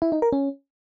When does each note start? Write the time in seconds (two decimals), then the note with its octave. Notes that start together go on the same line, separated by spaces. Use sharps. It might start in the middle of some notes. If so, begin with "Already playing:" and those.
0.02 E4
0.12 D#4
0.22 A#4
0.32 C#4